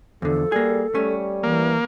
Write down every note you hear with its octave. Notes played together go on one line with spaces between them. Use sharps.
E2 D3 F3 A4
G3 A#3 G#4
G3 A3 C#4
E3 A#3